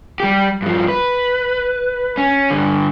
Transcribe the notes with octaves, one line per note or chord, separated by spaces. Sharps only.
G3 G4
G2 F3
B4
C#4
G2 D3